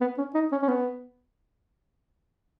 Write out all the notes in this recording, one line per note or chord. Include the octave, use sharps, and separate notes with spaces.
B3
C#4
D#4
C#4
C#4
B3